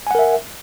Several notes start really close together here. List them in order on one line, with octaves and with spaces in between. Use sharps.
G#5 F#5 A#4 E5